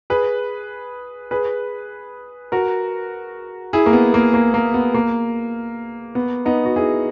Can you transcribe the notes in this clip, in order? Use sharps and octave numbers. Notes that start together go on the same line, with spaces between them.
G#4 B4
G#4 B4
F#4 A#4
E4 G#4
A#3
B3
A#3
A#3
A#3
B3
A#3
B3
B3 D#4
F#4
E4 G#4